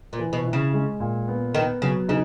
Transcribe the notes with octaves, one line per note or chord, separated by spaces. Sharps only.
A#2
E3
B2
E4
C#3
G#3
A#2
B3
D#3 B3
C#3 F#3
C#3 D#4